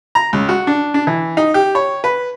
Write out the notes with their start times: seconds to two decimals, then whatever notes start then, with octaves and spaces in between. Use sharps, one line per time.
0.15 A#5
0.33 C#2
0.49 F#4
0.67 D4
0.94 D4
1.07 E3
1.37 D#4
1.54 G4
1.75 C#5
2.04 B4